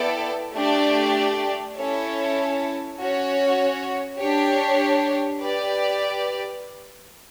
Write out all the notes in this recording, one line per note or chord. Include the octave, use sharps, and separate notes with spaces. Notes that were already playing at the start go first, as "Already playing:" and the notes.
Already playing: B3 E4 A4 D5 G5
A3 D4 G4 D5
C#4 E4 A4 C#5
C#4 F#4 C#5
D4 G4 C#5
G4 B4 D5